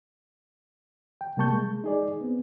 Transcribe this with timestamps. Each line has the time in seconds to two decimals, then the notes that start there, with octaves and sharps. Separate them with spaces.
1.21 G5
1.37 C3 G3 A#3 A5 C#6 G6
1.50 G#3
1.84 D#4 G#4 D5
2.21 B3 C4